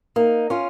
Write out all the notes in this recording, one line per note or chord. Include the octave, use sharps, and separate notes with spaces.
A#3 D#4
C#4 F4